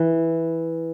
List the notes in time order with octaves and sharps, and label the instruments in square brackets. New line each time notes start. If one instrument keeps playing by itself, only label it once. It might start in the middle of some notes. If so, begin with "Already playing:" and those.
Already playing: [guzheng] E3